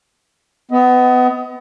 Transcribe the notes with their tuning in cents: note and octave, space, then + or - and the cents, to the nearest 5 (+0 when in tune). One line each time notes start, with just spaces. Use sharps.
B3 +25 D#5 +30